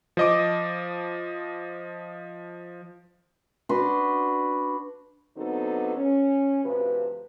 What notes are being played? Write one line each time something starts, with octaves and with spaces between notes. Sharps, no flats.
F3 D#5 D6
D4 F#4 B4 C6
D3 F#3 B3 C4 D#4 A4
C#4
D2 G2 C3 F3 B4